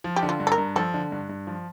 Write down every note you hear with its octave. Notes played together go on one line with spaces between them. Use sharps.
F3
G4
D3
F4
G2
A4
A#4
G2
F3 A4
D3
G2
G2
F3